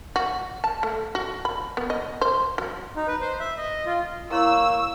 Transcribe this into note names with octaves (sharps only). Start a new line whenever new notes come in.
F#4
A5
A3
F#4
B5
B3
D#5
C5
F#3
D#4
B4
C5
E5
D#5
F4
A#3 E4 C#5 C6 C#6 E6